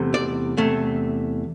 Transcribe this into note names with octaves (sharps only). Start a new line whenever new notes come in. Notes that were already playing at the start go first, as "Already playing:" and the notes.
Already playing: E2 C3 A3
D5
E2 C3 A3